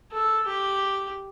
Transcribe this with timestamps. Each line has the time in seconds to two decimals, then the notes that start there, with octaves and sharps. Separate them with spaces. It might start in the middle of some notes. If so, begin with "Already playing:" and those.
0.12 A4
0.46 G4